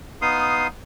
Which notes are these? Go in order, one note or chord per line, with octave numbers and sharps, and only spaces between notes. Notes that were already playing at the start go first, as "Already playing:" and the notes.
B3 D#4 F5 C6 D#6